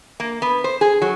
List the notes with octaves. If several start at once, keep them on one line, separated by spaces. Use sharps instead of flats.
A#3
B3
C5
G#4
F#3